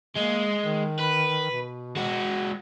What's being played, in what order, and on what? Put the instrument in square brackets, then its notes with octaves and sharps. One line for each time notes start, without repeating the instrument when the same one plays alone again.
[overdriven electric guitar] G#3 [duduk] A#3
[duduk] D#3
[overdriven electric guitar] B4
[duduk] B2
[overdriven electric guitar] G#3 F#4